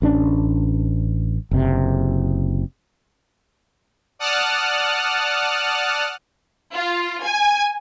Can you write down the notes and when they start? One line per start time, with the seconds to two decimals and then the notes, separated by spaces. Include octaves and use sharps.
0.02 A1 C#4 D4
1.51 F#1 C3
4.19 D5 F#5 A5 D#6 F6 F#6
6.73 F4
7.23 G#5